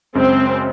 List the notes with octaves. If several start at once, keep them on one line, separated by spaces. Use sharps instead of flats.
F#2 C#3 G#3 C4